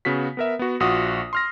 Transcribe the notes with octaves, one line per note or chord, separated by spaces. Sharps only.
C#3 B3 F#4 B6
B3 A#4 E5
B3 F#4
A#1 F4 F#4 D#6
C6 F6 A#6